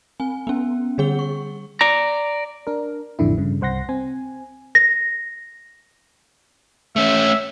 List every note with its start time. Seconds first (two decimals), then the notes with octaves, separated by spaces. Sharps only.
0.20 C4 G#5
0.47 B3 C#4
0.98 D3 G3 G#4 F#5 G7
1.19 C#6
1.81 D5 A#5
2.67 D4 A#4
3.19 A1 F2 D3 E4
3.38 G2 C#3
3.61 C2 C5 F#5 C6 A#6
3.89 C4 G#5
4.75 A#6
6.96 A3 C#4 E5